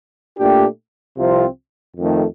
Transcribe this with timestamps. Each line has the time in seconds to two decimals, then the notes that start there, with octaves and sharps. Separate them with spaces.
0.37 A#2 A3 D4 G4
1.17 C2 C3 F3 C4 F4
1.97 F2 D#3 A3